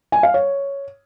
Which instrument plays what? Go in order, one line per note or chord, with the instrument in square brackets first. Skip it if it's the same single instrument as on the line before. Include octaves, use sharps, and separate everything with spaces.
[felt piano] G#5
F5
C#5